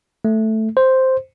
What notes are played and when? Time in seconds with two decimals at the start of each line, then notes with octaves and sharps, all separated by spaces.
0.25 A3
0.77 C5